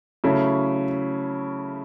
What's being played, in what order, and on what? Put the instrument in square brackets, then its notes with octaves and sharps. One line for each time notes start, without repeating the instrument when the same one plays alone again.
[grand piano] C#3 F#3 A3 C#4 E4